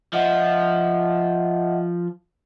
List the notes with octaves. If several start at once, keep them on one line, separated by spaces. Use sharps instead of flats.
F3 D#5 E5 F#5